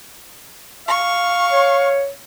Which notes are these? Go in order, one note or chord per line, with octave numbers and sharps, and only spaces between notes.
F5 C#6
C#5